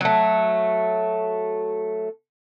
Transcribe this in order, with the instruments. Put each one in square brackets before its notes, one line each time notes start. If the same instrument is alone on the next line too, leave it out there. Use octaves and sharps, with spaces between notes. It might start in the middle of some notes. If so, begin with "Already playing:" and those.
[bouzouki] F#3 A3